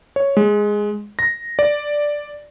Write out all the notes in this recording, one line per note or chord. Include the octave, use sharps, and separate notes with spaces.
C#5
G#3
A#6
D5